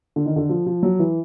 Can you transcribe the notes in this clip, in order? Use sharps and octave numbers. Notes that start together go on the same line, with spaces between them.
D3
D#3
D3
F3
F3
F#3
E3